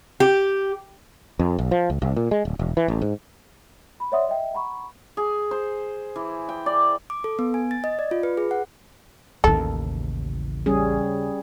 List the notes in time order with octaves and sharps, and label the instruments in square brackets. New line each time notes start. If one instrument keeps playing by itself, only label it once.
[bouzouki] G4
[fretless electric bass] F2
B1
F3
C#2
C2
A#2
G#3
D1
E1
E3
A1
G#2
[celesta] B5
C#5 D5 E5 F#5 C6 D#6
D#5 E5 G5
F#5 A#5 B5 C#6
[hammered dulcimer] G#4
C5
E3
G5
D5
[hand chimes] D6
A4
B3
G#5
A6
D#5
D5
F4
B4
G#4
F#5
[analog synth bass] A1 [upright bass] D#2 C#3 [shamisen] A4
[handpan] G3 C#4 G#4